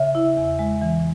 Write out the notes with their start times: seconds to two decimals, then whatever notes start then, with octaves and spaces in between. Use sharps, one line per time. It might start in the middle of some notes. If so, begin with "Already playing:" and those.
Already playing: C#3 E5
0.15 E4
0.37 E2
0.59 G#3
0.81 E3